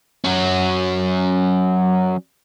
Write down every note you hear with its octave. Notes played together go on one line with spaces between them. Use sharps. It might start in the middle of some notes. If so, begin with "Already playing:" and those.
F#3 C#4